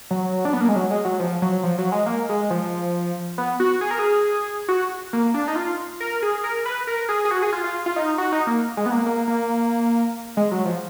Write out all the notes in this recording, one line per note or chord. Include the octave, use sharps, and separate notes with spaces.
F#3
D4
B3
A#3
G#3
F#3
G#3
F#3
F3
F#3
F3
F#3
G#3
A#3
G#3
F3
B3
F#4
G#4
A#4
G#4
F#4
A#3
D4
D#4
F4
A#4
G#4
A#4
B4
A#4
G#4
G#4
F#4
G#4
F4
F4
F4
D#4
F#4
D#4
A#3
G#3
B3
A#3
A#3
A#3
G#3
F#3
F3